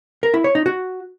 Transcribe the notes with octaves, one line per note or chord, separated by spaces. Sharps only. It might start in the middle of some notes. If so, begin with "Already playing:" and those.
A#4
E4
C#5
D#4
F#4